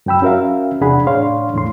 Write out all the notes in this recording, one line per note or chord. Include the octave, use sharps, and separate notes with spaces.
F#2 F#3 G5 B5 E6
C#4 F#4 A#4 E5 F5
E2 C3 D4 G#4 F#5 B5
A2 D4 C#5 F5 C6
E2 A2 C6